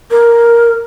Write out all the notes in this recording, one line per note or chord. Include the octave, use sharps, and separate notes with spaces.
A#4